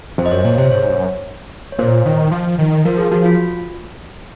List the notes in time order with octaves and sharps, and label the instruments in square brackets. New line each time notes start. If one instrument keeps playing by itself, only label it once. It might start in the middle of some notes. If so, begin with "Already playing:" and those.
[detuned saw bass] F2 [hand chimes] C5
[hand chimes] D#5
[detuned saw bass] F#2 [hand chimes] C#5
[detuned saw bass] A#2 [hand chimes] C#5
[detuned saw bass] C3 [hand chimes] C5
[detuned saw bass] G#2 [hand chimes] C#5
[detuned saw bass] F#2
[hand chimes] C#5
[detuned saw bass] A#2 [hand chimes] C5
[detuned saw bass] D#3
F3
D#3
[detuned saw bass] F3 [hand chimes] A#4
[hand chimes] G#4
[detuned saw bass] F3 [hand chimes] F#4
[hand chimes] F4